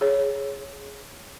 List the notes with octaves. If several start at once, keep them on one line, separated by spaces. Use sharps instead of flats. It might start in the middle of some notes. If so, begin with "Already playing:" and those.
G#4 C#5